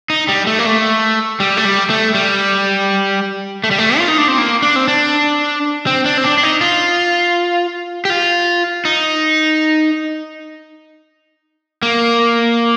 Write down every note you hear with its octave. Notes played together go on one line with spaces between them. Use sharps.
D#4
G3
A3
A#3
A3
G3
A3
G3
A3
G3
A3
G3
A3
F4
D#4
D4
C4
A#3
D4
C4
D4
C4
D4
C4
D4
D4
D#4
F4
G4
F4
D#4
A#3